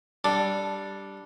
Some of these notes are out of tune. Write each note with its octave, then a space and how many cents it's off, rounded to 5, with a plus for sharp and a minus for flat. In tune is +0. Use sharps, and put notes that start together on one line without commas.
G3 +0 D4 +0 A4 +0